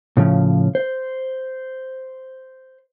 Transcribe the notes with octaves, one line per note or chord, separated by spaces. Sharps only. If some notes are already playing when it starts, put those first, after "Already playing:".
A2 C#3 F3
C5